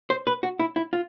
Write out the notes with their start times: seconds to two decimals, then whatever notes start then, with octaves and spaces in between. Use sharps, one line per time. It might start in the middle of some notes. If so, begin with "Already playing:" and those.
0.10 C5
0.27 B4
0.43 F#4
0.59 E4
0.76 E4
0.93 F4